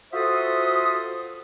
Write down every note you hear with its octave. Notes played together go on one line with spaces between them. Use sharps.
F4 F#4 A4 C5 E5 D#6